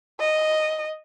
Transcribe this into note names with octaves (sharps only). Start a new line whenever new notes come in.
D#5